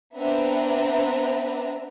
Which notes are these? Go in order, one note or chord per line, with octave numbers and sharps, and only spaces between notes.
B3 C4 D4 B4 E5 A#5